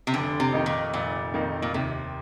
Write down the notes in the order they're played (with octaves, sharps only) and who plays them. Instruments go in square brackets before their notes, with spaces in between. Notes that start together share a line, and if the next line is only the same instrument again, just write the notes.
[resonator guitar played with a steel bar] C3
[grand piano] F1 [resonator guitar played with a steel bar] D3
[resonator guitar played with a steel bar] C3
[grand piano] F2 D#3 A#3 D#4
[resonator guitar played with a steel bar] A#2
[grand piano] F1 [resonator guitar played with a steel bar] A#2
[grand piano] F2 D#3 A#3 D#4
[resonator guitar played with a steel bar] A#2
[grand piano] D#2 [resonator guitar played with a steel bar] C3